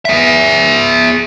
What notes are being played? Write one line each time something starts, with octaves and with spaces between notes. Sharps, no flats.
G#4 E5